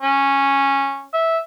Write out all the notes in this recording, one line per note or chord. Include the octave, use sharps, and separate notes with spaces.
C#4
E5